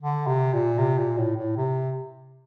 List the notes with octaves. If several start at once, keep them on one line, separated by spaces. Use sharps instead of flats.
D3
C3
A#2
C3
A#2
A2
A2
C3